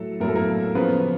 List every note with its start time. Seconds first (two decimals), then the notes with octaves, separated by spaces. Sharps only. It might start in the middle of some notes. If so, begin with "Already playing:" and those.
Already playing: A2 F#3 A4
0.20 A2 F#3 A#4
0.28 A4
0.36 A#3 A#4
0.75 C#3 F3 B3 B4